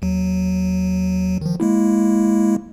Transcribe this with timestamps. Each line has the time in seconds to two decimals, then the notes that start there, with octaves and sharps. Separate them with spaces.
0.02 D#2 F#3
1.41 D#3 F3
1.60 G#3 A#3 E4